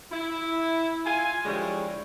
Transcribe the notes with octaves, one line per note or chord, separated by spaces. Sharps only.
E4
F4 G#5
D3 F3 G3 G#3 E4 C#5